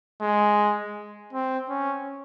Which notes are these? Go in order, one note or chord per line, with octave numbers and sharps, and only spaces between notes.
G#3
C4
C#4